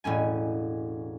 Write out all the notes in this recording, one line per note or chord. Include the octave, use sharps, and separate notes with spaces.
E1 A2 C#4 G#5